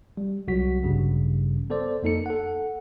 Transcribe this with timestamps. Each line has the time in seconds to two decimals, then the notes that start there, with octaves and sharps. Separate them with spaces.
0.17 G3
0.48 C2 F#3 F#4 B6
0.83 A1 G2 C#3 G3
1.70 B3 A4 C5 D5
2.03 F2 A#3 D#4 A4 C#7
2.26 A4 F#5